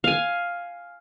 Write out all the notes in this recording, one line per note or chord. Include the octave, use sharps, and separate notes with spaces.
F5 G#5